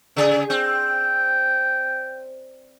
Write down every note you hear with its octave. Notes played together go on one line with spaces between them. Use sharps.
C#3 G#4
C4 G5